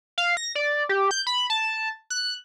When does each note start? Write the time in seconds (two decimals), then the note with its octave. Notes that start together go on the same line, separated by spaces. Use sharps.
0.18 F5
0.37 A#6
0.55 D5
0.89 G4
1.11 G6
1.27 B5
1.50 A5
2.10 F#6